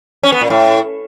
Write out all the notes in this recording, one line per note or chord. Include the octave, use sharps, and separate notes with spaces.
C#4
B3
A#2
A2